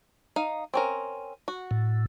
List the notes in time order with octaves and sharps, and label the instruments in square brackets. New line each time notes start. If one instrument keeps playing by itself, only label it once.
[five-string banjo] D#4 F5
C4 C#4 A#4
F#4
[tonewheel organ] A2